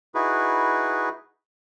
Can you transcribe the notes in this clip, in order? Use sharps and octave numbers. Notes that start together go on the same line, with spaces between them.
D#4 E4 F#4 G#4 B4